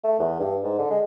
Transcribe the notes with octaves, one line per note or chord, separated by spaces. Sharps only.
A3
E2
G2
G#2
D3
G#3